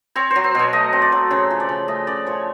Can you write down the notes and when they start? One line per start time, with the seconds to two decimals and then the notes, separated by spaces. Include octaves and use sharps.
0.15 C4 C#5
0.31 C5
0.36 F#3
0.44 C5
0.55 B2 C#5
0.73 A3 D#5
0.93 C4
1.02 D5
1.12 F#3
1.31 C#3 C#5
1.50 F3
1.60 D5
1.69 C#3
1.88 A3 D#5
2.07 C#3 D5
2.26 F3 C#5